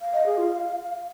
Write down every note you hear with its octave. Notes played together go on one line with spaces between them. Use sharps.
F5
D#5
G#4
F4